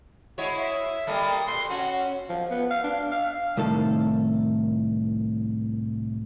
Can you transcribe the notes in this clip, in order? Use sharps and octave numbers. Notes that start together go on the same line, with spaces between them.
G#3 E4 F#4 C#5
E5
G3 G#3 A#3 A4
A#2 C6
C#4 F#4
F3
B3
F5
D4
F5
C2 A2 D#3 A4